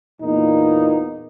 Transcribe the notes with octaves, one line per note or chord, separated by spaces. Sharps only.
E2 A#2 A#3 B3 D#4